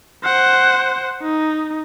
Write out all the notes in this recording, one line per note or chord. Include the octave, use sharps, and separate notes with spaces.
C5 F#5
D#4